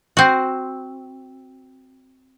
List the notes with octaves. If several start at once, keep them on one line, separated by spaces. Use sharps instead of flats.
C4 F#4